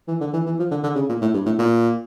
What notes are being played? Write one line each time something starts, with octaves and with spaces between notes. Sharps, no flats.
E3
D3
E3
E3
F3
D3
D3
C#3
A#2
A2
G2
A2
A#2